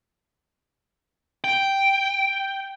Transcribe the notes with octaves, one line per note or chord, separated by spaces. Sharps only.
G5